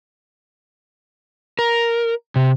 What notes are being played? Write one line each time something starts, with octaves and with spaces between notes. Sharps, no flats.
A#4
C3